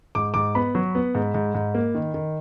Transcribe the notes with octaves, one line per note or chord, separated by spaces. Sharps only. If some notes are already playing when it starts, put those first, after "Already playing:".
G#2 D6
G#2 D6
B3 B5
F#3
B3
G#2
G#2
G#2
A#3
D#3
D#3